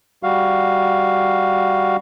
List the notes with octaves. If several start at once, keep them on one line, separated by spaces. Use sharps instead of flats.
G3 F#4 F5